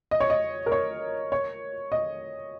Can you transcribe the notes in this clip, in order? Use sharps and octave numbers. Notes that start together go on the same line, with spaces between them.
D#5
C#5
D#5
A#4
C#5
C#5
D#5